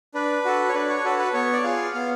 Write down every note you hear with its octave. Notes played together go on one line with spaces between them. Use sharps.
D4 B4
F#4 A4
C#5
D4 B4
C#5
F#4 A4 B4
B4
B3 C#5
D5
F4 G#4 F5
B3 F5